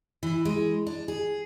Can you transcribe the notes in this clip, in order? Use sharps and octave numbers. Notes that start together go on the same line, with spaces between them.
E3
G#3
D4
G#4